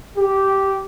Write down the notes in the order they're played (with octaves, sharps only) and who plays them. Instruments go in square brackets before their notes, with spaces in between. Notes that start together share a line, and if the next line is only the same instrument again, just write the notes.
[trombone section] G4